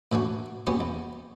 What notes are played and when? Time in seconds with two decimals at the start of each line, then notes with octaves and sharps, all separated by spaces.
0.12 A2 E3 D4 F#4
0.67 F#3 B3 C#4 G4
0.80 E2